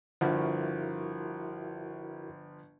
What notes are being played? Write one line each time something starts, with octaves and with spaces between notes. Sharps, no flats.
G1 F3 E4 F#4 A#4